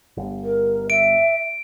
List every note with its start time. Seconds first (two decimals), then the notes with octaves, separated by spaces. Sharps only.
0.17 G1
0.43 A#4
0.90 E5 D7